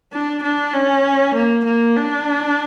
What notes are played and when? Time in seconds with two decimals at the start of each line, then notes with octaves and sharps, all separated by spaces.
0.13 D4
0.43 D4
0.73 C#4
1.34 A#3
1.65 A#3
1.96 D4